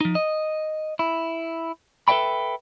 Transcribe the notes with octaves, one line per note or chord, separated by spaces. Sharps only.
F3 D#4
D#5
E4
A4 B4 D5 E5 G5 B5